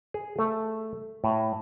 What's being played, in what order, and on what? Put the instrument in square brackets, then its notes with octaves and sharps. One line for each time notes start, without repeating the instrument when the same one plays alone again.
[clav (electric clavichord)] G#4
A3
A2